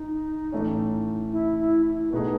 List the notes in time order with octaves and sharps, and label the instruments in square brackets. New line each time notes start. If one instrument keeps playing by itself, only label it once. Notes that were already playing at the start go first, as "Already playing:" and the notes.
Already playing: [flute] D#4
[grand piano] A2 E3 A3 C#4
[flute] E4
E4
E4
[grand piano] B2 A3 D#4 G#4 [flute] B4